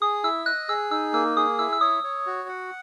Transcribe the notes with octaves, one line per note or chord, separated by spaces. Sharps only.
G#4 D#6
E4 E6
D#5 F#6
G#4 E6
D#4 E6
A#3 E6
G#4 D#6
E4 E6
E6
C#5 D#6
C#5
F#4
F#5